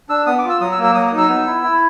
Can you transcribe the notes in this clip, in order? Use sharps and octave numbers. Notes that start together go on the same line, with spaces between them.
D4 E6
B3 D#6
D6
F4
E6
F#3 D#6
E6
A#3
E6
F#3 D#6
D#6
D#4
E6
B3
E4
E4